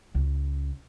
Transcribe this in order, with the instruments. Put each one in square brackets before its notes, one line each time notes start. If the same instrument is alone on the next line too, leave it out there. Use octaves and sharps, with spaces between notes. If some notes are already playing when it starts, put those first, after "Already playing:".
[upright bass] C#2